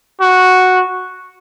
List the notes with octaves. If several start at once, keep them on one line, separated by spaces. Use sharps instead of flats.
F#4